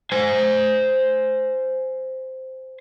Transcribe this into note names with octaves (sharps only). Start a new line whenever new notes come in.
C5 G#5